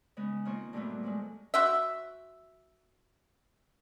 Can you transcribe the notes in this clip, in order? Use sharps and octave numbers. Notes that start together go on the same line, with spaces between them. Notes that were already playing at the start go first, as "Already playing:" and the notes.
C#3 G#3 B3
D#3 A#3 C4 F4 C#5
G2 A#2 D3 F#3 A3 B3
F3 F#3 G#3
F#4 C5 E5